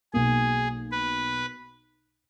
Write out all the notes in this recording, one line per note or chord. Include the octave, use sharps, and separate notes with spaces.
B1 B2 A#3 G#4
B4